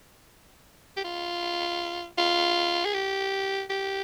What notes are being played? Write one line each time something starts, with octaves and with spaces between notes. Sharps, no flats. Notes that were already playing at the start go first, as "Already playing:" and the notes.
G4
F4
F4
G#4
G4
G4